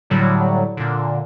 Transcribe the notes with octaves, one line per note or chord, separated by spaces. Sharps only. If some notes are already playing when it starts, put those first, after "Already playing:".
A2 D3 F#3 G3
A#2 D3